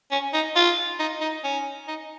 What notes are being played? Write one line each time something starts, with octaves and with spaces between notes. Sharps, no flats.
C#4
D#4
F4
D#4
D#4
C#4
D#4